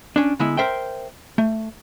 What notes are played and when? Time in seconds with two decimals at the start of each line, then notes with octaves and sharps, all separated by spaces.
0.16 C#4 D4
0.39 D3 G#3 B3 E4
0.57 A#4 C5 E5 G5
1.38 A3